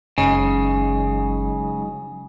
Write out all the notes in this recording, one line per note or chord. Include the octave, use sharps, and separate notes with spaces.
F#1 C#3 F#3 G#3 D#4 G#5